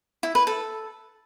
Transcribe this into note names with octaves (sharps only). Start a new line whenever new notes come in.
E4
B4
A4